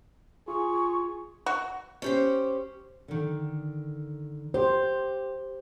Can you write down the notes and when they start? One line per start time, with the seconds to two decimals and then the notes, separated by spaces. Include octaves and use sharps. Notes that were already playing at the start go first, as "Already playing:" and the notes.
0.48 F4 G#4 C#6
1.46 F#4
2.02 C#4 G4 C5
3.08 D3 D#3
4.54 G4 C5